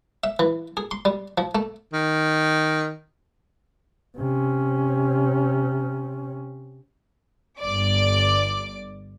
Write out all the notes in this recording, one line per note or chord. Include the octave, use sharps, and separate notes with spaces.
E5
E3
G#4
C6
G3
F3
A3
D#3
C3 C#4
G1 D5 D6